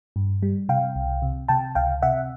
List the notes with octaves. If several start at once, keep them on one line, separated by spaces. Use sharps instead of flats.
G2
G3
C3 F5 G5
C2
C3
C3 G5 A5
C#2 F5 G5
C3 E5 F#5